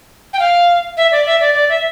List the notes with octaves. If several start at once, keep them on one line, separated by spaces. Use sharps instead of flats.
G5
F5
E5
D5
E5
D5
D5
E5